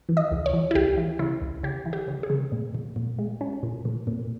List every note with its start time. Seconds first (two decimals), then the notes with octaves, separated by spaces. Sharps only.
0.09 E3
0.17 D#5
0.31 C#2
0.46 C#5
0.53 E3
0.71 E4
0.75 C#2 G4
0.97 E3
1.19 C#3 E4
1.42 C#2
1.63 C#3 G4
1.86 E3
1.93 G4
2.08 C#3
2.23 G#4
2.30 C#3
2.52 A#2
2.75 A#2
2.96 A#2
3.19 G#3
3.41 C#4
3.63 A#2
3.85 A#2
4.07 A#2